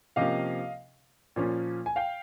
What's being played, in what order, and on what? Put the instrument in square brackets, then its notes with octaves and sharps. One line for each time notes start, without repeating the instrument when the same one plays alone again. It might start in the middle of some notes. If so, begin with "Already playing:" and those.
[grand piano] C3 F3 A#3 C#4 D#5 F5
A#2 F3 A#3 C#4
G#5
F5 G5